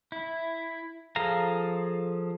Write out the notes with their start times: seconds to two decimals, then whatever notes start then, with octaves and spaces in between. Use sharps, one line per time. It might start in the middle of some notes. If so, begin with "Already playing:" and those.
0.12 E4
1.16 F3 G#4 A4 F5 A#5